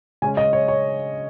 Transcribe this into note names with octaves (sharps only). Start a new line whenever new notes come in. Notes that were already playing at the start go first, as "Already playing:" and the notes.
C#3 G#3 C#4 G#5
D#5
C#5
C#5